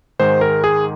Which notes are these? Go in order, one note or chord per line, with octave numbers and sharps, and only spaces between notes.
G#2 D#3 G#3 C5
A#4
G#4